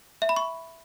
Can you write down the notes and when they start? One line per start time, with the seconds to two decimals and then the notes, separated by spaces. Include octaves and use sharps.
0.22 E5
0.29 B5
0.36 C#6